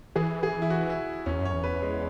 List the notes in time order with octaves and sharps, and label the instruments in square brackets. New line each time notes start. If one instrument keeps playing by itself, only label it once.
[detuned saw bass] E3 [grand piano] G#4
[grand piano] G#4
E4
F#4
E4
[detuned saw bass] E2 [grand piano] C#4
[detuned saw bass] F#2
[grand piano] C#5
[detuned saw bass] E2
[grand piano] B4
G#3